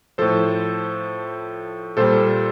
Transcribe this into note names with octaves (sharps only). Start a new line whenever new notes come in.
A2 F3 A4 C5
A#2 G3 A4 C5